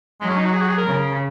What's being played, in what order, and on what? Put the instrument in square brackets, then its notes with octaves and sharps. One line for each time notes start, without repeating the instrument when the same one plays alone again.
[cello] F#3 [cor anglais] G#3
[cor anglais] C#4
D#4
F#4
G#4
F#4
G#4
A#4
[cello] C#3